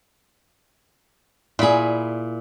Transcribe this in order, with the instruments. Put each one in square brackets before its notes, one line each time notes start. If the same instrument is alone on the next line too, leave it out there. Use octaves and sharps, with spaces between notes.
[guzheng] A#2 B5 [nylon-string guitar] E4 G#4